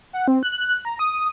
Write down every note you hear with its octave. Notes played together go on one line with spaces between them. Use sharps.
F#5
C4
F#6
A#5
D#6